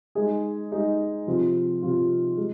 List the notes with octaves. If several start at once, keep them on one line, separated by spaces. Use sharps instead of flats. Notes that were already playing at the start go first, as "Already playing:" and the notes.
G#3 D#4 G#4
G#3 D#4 G#4
C3 F3 C4 F4
C3 F3 C4 F4
G#3